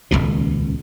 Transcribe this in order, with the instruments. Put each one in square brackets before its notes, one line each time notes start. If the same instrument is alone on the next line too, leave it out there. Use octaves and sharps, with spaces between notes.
[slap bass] D#1 G#1 C#2 B2